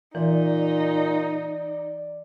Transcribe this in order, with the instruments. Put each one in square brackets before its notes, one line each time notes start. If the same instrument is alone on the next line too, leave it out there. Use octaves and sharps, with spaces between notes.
[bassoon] A#2 [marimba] E3 [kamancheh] D#4 [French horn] D5